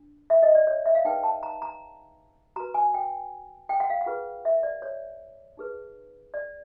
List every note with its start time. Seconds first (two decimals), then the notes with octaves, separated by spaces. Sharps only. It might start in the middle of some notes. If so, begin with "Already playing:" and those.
Already playing: D4
0.30 E5
0.43 D#5
0.55 D5
0.67 C#5
0.86 E5
0.95 F5
1.05 D#4 G#4 B4 G5
1.24 A5
1.43 A#5
1.62 A#5
2.56 F#4 B4 A#5
2.74 G#5
2.94 G5
3.69 G5
3.80 F#5
3.90 F5
4.01 F#5
4.06 F4 G#4 B4
4.45 E5
4.63 D5
4.82 C#5
5.57 D#4 G#4 B4
6.34 D5